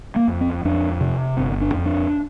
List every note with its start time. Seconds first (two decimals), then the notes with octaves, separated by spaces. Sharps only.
0.16 A#3
0.28 F2
0.41 C4
0.65 F2 D4
1.01 C3
1.37 G1 C4
1.61 D4
1.74 F2
1.86 D4